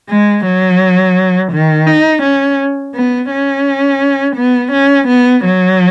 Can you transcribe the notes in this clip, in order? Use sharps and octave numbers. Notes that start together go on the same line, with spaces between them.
G#3
F#3
D#3
D#4
C#4
B3
C#4
B3
C#4
B3
F#3